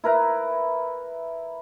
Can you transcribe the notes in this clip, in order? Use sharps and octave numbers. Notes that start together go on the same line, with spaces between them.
E4 A#4 B4 A#5